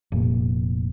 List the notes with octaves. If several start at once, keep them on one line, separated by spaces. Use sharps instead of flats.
F1 A#2